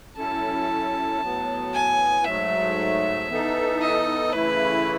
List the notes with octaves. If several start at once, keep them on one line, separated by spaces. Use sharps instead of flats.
A2 F#3 C#4 E4 A4 A5
A2 F#3 B3
G#5
G#2 F#3 A3 E5
E3 B3 D#4 A4
D#5
C#3 E3 A3 E4 B4